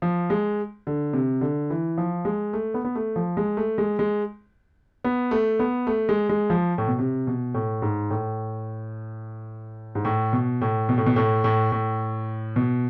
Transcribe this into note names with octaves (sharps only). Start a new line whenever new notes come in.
F3
G#3
D3
C3
D3
E3
F3
G#3
A3
B3
B3
A3
F3
G#3
A3
G#3
G#3
B3
A3
B3
A3
G#3
G#3
F3
A2
B2
C3
B2
A2
G#2
A2
G#2
A2
B2
A2
B2
A2
B2
A2
A2
A2
B2